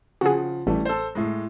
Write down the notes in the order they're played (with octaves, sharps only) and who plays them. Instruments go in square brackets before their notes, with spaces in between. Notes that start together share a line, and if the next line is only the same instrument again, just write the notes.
[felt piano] C#3 F3 F#5 [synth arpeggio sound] F#4 G#4
[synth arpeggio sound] A1 [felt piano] E3 G3 A3
[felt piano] A4 C5
A2 G#3